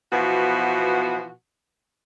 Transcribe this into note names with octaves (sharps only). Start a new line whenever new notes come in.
B2 E3 F3 B3 F#4